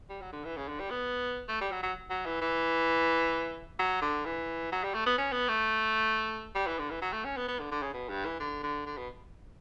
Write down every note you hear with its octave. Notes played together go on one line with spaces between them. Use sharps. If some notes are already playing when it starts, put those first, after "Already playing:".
G3
F#3
D3
E3
C#3
D3
G3
B3
A3
G3
F#3
F#3
F#3
E3
E3
F#3
D3
E3
F#3
G3
A3
B3
C#4
B3
A3
G3
E3
D3
E3
F#3
A3
C#4
B3
B3
D3
D3
C#3
B2
G2
E3
D3
D3
D3
B2